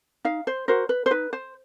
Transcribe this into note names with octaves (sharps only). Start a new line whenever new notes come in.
D#4 F5
C5
F#4 A#4 C5
B4
C5
D#4 B4
C5